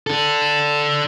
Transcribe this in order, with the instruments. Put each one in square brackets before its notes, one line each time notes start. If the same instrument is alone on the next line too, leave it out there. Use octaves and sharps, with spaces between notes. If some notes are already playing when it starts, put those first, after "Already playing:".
[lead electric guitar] D4 A4